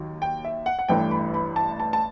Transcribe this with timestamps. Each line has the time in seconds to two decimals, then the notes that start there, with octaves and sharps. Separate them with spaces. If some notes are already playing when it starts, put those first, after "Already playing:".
Already playing: D#2 D#3 F#3
0.22 G5
0.45 E5
0.66 F#5
0.79 F#5
0.88 A1 G2 E3 A3 G5
1.11 B5
1.34 B5
1.56 A5
1.80 A5
1.93 A5